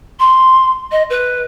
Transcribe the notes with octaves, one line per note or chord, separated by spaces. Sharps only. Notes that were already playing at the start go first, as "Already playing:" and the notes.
C6
D#5
B4